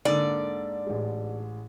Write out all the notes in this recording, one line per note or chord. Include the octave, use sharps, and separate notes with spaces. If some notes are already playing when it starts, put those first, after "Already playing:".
G#2 D3 A#3 D5
A1 G#3